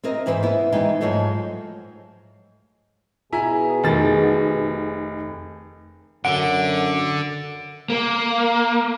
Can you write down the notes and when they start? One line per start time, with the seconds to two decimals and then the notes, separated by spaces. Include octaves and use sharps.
0.03 C4 E4 A#4 D#5
0.26 G#2 E3 B4 C5 E5
0.43 B3 E4
0.72 D#3 E3 G#3 D#4
1.01 G#2 F3 F#3 G#3 A3
3.33 B2 E4 G#4 G#5 A#5
3.84 F1 D#3 A6
6.25 F#2 D3 F#5 D7
7.90 A#3